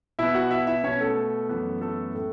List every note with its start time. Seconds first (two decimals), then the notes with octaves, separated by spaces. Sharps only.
0.19 B2 B3 E4 E5
0.35 F#4 F#5
0.51 E4 E5
0.67 E4 E5
0.83 B2 B3 C#4 C#5
1.00 A3 A4
1.49 F#2 E3 B3
1.81 A3 A4
2.14 A2 A3